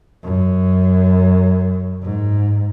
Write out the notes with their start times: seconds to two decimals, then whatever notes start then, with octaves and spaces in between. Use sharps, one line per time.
0.24 F#2
2.03 G#2